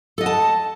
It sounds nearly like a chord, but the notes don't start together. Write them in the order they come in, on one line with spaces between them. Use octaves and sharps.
A4 D#5 F#5 A5